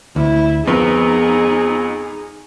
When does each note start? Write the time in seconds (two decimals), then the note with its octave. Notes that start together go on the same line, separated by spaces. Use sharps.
0.16 D2 E4
0.67 F2 B3 D#4 G#4 A#4 B4